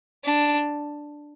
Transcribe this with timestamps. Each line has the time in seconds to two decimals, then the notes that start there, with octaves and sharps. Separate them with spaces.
0.24 D4